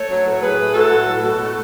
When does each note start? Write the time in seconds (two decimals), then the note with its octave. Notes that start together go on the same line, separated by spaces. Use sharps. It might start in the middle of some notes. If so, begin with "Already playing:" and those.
Already playing: A3 A4 C#5
0.09 F#3
0.25 A2 B4
0.33 C#5
0.42 A2 G#4 B4
0.59 A3
0.74 F#3 F#4 A4
0.91 A2
1.07 A2
1.23 B2 F#4 A4
1.40 A3